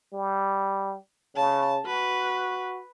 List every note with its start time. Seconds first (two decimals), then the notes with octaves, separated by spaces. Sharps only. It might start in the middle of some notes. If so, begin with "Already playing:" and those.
0.14 G3
1.36 C#3 A5
1.86 F#4 B4